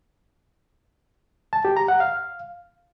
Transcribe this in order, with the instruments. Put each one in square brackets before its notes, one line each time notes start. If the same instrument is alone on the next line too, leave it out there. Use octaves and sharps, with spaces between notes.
[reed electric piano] A5
G4
A#5
F#5
F5